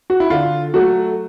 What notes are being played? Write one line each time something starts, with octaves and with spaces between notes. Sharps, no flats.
F#4
E4
D3 F4
F#3 A3 F#4